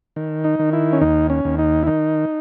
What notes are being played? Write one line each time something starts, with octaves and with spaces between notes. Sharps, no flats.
D#3
D#4
D#3
E4
C#4
D#2 D#4
C#4
D#2
D#4
E4
D#3 D#4